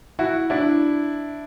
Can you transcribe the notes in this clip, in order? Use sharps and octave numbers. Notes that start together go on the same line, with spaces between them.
E4 F#4
D4 E4